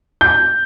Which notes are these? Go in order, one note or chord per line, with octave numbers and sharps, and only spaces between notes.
G6